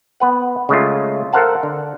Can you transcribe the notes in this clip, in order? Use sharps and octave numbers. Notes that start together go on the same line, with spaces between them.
B3 B4 F#5
C#3 G#3 A3 F4
A4 A#4 C5 F5 F#5 A5
D3